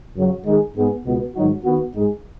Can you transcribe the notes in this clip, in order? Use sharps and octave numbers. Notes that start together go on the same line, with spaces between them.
F#2 C#3 F#3
D#3 G#3 D#4 G#4
G#2 G#3 B3 G#4
C#2 B2 B3 F#4
G#2 D#3 F#3 D#4 F#4
D#3 B3 F#4
G#2 G#3 D#4 G#4